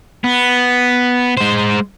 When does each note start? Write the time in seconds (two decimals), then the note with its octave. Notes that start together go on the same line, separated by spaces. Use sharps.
0.24 B3
1.37 G#3 C5